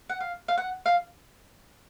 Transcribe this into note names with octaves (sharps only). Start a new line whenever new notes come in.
F#5
F5
F5
F#5
F5